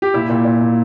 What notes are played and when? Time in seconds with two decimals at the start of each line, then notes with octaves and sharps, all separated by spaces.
0.02 G4
0.14 A#2 E4
0.30 A#2
0.45 A#2
0.61 A#2